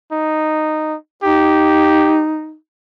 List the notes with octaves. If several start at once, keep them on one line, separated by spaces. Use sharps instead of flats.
D#4
D#4 G4